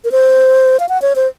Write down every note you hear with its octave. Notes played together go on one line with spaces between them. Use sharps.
A#4
C5
F5
F#5
C#5
C5